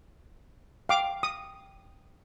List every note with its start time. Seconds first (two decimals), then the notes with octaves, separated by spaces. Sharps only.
0.89 F5 G5 D6
1.23 D#6